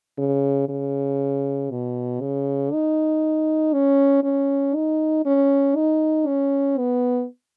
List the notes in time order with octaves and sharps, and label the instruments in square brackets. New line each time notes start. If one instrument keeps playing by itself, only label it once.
[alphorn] C#3
C#3
B2
C#3
D#4
C#4
C#4
D#4
C#4
D#4
C#4
B3